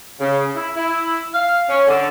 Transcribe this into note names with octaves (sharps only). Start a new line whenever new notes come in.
C#3
E4
E4
F5
C#4
D3